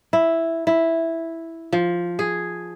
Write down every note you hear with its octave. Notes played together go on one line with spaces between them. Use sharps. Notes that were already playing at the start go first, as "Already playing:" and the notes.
E4
E4
F3
G#4